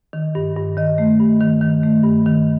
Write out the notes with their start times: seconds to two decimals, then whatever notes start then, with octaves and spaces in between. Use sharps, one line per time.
0.13 D#3
0.35 G2
0.56 G2
0.77 D#3 D#5
0.98 A3
1.20 G2
1.41 D#3
1.61 D#3
1.83 A3
2.04 G2
2.26 D#3